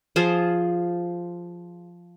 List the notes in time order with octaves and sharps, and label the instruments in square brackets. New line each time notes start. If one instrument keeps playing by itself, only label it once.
[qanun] F3 F4 G#4 C5